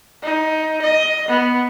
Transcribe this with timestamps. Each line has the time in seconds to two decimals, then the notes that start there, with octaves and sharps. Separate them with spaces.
0.23 D#4
0.81 D#5
1.28 B3